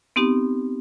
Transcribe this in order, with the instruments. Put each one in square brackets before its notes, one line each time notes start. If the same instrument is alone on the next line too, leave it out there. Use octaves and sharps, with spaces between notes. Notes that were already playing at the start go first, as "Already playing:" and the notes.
[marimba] B3 C4 D#4 G4